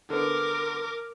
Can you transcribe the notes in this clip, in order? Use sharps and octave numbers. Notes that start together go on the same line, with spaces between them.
D3 B3 A#4 D6